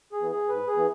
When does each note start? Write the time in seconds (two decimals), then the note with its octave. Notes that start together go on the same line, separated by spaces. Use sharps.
0.12 G#4
0.21 E3 B3
0.31 G#4
0.49 G#2 B4
0.67 G#4
0.76 E3 B3